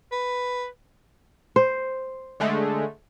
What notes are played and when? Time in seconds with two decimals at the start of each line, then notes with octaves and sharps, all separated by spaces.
0.12 B4
1.56 C5
2.40 D3 G#3 A3